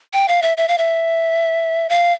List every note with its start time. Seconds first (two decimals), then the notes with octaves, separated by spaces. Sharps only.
0.13 G5
0.28 F5
0.42 E5
0.57 E5
0.68 F5
0.78 E5
1.89 F5